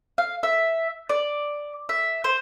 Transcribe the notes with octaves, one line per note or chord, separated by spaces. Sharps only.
F5
E5
D5
E5
C5